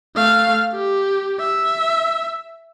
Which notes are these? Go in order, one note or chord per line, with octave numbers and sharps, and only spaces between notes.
A3 F5
G4
E5